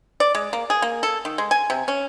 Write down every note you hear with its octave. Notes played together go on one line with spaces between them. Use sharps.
D5
G#3
A#3
G#4
A#3
A4
D#3
G#3
G#5
C3
C#4